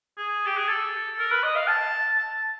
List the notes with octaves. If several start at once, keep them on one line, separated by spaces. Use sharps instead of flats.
G#4
G4
G#4
A4
A#4
B4
D#5
F5
A5
A5